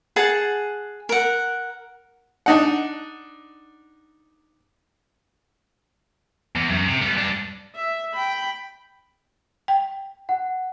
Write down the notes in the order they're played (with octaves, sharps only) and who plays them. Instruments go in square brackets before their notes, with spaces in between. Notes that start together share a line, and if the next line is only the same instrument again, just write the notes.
[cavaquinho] G#4 F#5 A5
A#4 F#5
[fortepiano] D4 D#4 F#5
[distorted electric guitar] E2
F#2
C3
G3 B3
G2 D4
[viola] E5
G5 B5
[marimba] G5
[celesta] F#5